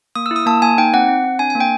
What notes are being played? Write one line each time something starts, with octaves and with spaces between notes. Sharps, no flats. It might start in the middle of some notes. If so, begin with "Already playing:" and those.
A#3 D#6
E6
E4
D#6
A#3 A5
A#3 G#5
D#4 G5
C4 F#5
C4
C4
D4 G#5
G#5
A#3
G5